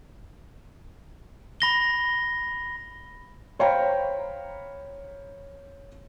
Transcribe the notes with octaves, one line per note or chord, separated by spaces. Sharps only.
B5 A#6 G7
C5 C#5 F5 G5 A#5 B5